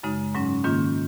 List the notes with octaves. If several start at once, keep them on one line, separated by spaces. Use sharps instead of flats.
F#2 C#3 G#3 D#4
G#2 F#3 C#4
G#2 D#3 A#3 C#4 F4